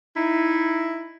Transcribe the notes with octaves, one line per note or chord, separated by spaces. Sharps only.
D#4 E4